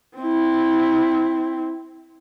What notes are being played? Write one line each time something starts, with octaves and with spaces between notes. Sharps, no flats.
C4 E4